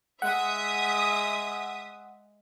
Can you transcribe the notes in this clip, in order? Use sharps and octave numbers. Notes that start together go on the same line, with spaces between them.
G#3 E5 F#5 D#6